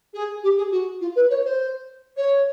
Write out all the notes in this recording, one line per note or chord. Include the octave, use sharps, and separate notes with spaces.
G#4
G4
G#4
F#4
F4
B4
C#5
C5
C#5